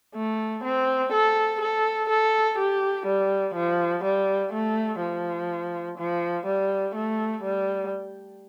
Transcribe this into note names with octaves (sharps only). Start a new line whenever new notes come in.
A3
C4
A4
A4
A4
G4
G3
F3
G3
A3
F3
F3
G3
A3
G3